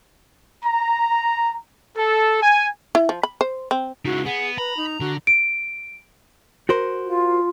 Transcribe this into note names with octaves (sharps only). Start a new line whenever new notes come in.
A#5
A4
G#5
E4
F3
B5
C5
C4
C#2 C#3 D#4 E4 F#4
B3 G#4 F#5
B4 A#5 B5
D#4
D3 F#4
D7
F#4 A#4 C5
F4